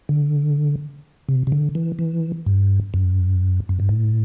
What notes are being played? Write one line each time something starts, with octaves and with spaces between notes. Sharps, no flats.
D3
C3
C3
D3
E3
E3
G2
F#2
F#2
G2
A2